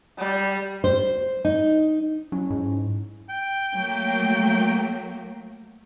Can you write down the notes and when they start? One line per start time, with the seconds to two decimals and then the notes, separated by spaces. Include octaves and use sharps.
0.18 G3
0.84 C5
1.45 D#4
2.32 F#3 C#4 E4
2.50 G#2
3.29 G5
3.75 F#3 A3 A#3